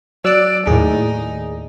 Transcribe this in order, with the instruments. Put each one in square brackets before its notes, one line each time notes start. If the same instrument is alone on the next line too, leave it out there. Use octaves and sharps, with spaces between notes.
[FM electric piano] F#3 [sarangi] D5 [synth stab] E6 F#6
[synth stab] D#2 A2 [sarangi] D#4 [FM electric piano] G#4